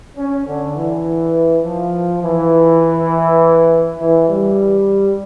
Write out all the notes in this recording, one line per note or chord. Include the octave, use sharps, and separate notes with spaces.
C#4
D3
E3
F3
E3
E3
G3